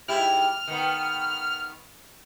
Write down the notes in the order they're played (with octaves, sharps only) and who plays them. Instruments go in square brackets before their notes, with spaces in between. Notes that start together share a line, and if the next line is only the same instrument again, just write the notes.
[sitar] G#2 E4 G4 [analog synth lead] F6
[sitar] D#3 B3